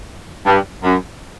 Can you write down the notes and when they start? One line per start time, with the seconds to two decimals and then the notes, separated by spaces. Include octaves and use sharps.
0.46 G2
0.84 F#2